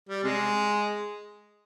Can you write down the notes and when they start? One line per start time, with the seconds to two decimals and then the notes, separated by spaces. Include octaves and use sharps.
0.09 G3
0.24 C3 G#3